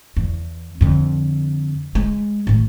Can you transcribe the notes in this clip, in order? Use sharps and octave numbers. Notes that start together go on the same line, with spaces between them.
E2
F2 D3
G#3
A1 D#3